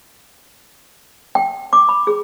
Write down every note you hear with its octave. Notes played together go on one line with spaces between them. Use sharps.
G5
D6
B5
G#4